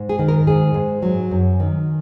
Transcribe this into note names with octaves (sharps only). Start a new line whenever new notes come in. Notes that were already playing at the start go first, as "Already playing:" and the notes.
Already playing: G#2
G#4
D#3
A#4
G#2 G#4
G#2
F#3
F#2
D#3